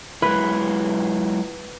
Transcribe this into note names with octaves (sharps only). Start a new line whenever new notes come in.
F#3 G#3 E4 B4